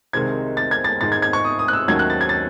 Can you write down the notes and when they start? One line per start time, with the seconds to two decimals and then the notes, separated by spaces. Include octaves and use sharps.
0.13 C2 C3 D#3 G#3 C4 G#6
0.57 A6
0.71 G#6
0.84 A6
1.00 G#2 D#3 G#3 A6
1.12 G#6
1.22 G#6
1.33 C#6
1.44 D#6
1.59 D#6
1.68 F#6
1.73 E6
1.88 D#2 D#3 F#3 A3 C#4 G#6
1.99 F#6
2.10 A6
2.21 G#6
2.29 A6